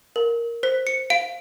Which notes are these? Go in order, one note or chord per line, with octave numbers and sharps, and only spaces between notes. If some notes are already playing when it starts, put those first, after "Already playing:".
A#4
C5 B6
C#7
F5 D7